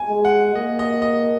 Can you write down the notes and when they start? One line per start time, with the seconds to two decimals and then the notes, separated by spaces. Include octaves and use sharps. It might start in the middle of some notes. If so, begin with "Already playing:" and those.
Already playing: G#5
0.09 G#3
0.25 F#5
0.55 A#3 D#5
0.79 D#5
1.02 D#5